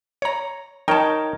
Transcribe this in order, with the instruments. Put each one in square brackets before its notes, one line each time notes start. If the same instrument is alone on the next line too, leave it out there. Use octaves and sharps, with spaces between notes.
[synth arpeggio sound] C#5 A#5
[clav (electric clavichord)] D#4 A#4 C#5 [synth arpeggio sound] G5 A5